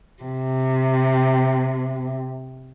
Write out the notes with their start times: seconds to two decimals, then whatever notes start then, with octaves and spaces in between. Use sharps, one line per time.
0.23 C3